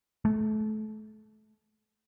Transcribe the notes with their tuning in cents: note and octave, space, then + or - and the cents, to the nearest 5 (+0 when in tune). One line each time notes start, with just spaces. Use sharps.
A3 -30